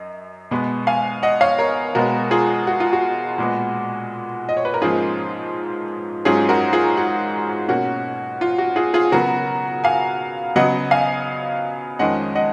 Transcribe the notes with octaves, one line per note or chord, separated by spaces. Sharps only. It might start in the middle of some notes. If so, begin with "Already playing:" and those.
Already playing: F#2 D#5
B2 G#3 B3
F5 G#5
D#5 F#5
C#5 F5
A#4 C#5
B2 G#3 B3 F#4 A#4
F4 G#4
F#4
F4
F#4
A#2 G#3 B3
D#5
C#5
B4
A#4
G#2 F3 A#3 C#4 F4 G#4
G#2 F#3 C#4 F4 G#4
F#4 A#4
F4 G#4
F#4
B2 A#3 C#4 F#4
F4
F#4
F4 G#4
F4 G#4
C#3 F#3 B3 F#4 A#4
F5 G#5
C#3 F#3 B3 D#5 F#5
F5 G#5
F2 D#3 G#3 C#4 D#5 F#5
D#5 F#5